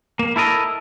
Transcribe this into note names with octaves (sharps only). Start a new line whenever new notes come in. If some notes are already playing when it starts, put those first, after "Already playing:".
A#3
E4 A4 A#4 D#5